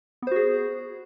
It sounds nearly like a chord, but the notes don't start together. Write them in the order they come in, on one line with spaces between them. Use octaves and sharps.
B3 C5 F#4 G#4